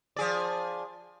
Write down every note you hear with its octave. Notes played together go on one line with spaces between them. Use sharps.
F3 G#4 D5